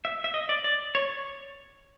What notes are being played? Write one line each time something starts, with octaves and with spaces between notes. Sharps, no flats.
E5
E5
D#5
D5
D5
C#5